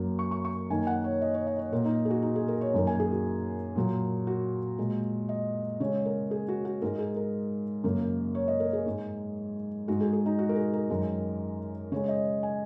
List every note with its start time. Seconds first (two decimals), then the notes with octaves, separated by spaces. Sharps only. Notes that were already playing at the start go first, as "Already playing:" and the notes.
Already playing: F#2 F#3 A#3
0.19 C#6
0.31 C#6
0.45 C#6
0.70 F#2 D#3 A#3 G#5
0.87 F#5
1.04 C#5
1.21 D#5
1.34 C#5
1.47 D#5
1.59 C#5
1.72 A#2 A#3 A#4
1.85 D#4
2.05 G#4
2.10 F#4
2.22 D#4
2.36 G#4
2.48 A#4
2.61 C#5
2.74 F#2 D#3 A#3
2.87 G#5
3.00 G#4
3.12 F#4
3.76 A#2 F#3 A#3
4.27 F#4
4.78 A#2 G#3
5.29 D#5
5.80 C#3 G#3 C#5
6.05 A#4
6.31 G#4
6.48 F#4
6.65 F#4
6.82 G#2 G#3 A#4
6.99 G#4
7.16 A#4
7.84 F#2 C#3 A#3
8.35 C#5
8.48 D#5
8.60 A#4
8.73 G#4
8.86 G#2 G#3
9.88 G#2 G#3 F#4
10.01 G#4
10.13 G#4
10.26 D#4
10.39 F#4
10.49 A#4
10.56 G#4
10.73 A#4
10.90 F#2 D#3 G#3
11.92 C#3 G#3 C#5
12.08 D#5
12.43 G#5